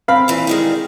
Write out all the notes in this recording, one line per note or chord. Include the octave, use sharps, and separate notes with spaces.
C4 F5 B5
A#2 E3
D#3 G3 G#3